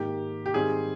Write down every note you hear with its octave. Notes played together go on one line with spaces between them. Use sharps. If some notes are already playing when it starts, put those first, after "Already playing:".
Already playing: G#2 D#3 A#3 G4
G4
G#2 D#3 G3 C4 G#4